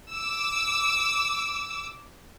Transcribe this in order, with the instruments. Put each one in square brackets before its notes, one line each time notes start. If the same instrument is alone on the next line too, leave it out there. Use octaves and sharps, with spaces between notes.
[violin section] D6 E6